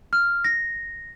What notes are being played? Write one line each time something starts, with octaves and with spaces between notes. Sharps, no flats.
F6
A#6